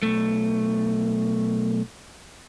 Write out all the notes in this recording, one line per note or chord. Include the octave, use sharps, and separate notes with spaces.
B1 A3